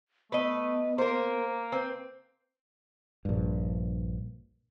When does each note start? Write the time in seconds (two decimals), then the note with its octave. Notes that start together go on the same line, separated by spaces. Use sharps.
0.32 A3 B3 B4 D#5
0.98 A#3 A#4 C5
1.72 C4 B4
3.25 A#1 G2